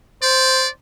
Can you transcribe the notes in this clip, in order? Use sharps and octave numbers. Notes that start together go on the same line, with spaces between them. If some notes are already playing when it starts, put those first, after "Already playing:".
C5 D5